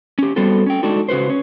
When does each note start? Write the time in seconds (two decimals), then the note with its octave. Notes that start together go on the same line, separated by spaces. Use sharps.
0.19 C#4 G4
0.36 G3 B3 C4 F#4 A4
0.66 C#4 G5
0.83 G#3 D4 D#4 F#4 A4
1.09 C#3 F#4 B4 C5
1.29 C#4